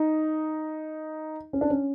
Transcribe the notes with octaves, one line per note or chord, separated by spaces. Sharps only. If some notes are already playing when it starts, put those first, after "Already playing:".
Already playing: D#4
C#4
D4
C#4